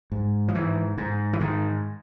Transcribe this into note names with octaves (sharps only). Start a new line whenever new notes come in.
G#2
F3
G#2 E3
G#2
E3
G#2 D#3